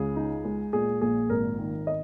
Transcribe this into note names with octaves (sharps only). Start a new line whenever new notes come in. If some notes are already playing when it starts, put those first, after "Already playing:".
Already playing: C#2 C#3 G#4
D#4
G#3
A#2 G#4
A#1 G#4
G#1 A#4
D#3
D#5